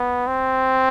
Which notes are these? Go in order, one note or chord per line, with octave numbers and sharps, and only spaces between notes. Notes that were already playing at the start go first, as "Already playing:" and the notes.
Already playing: B3
C4